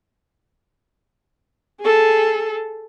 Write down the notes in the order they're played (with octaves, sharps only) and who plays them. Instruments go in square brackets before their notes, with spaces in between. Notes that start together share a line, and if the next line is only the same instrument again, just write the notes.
[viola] G#4 A4